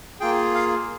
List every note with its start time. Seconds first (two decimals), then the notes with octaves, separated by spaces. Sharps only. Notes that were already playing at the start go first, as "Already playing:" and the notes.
0.20 A#3 F4 G#4 G5
0.54 F5